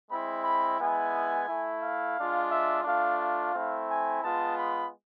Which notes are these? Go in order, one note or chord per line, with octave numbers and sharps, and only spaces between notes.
G#3 C4 E4 B5
B5
G#3 B3 E4 G#5
A3 E4
F5
G#3 D4 F4
E5
A3 D4 F4 F5
F5
A3 C4 E4
G#5
G#3 B3 F4 A5
B5